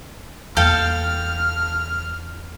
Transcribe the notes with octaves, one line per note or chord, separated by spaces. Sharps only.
E2 A#3 A4 F5 G5 F6